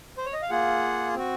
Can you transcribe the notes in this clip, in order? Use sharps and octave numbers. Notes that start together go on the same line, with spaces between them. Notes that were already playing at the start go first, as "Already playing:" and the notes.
C5
C#5
D#5
F5
A#3 F4 G#4 F#5
C4 F#4